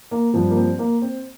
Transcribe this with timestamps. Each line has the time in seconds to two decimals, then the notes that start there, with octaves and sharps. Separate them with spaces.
0.11 A#3
0.34 G2 F3 C4
0.50 A#3
0.57 C4
0.79 A#3
1.02 C4